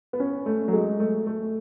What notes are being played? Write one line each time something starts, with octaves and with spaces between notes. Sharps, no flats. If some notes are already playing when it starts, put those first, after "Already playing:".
B3
C#4
A3
F#3
G#3
A3
A3